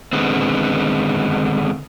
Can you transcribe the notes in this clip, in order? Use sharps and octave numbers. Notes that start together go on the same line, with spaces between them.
D3 D#3 G#3 B3 C4